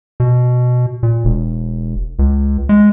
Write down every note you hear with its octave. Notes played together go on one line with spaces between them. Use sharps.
B2
A#2
E1
C#2
G#3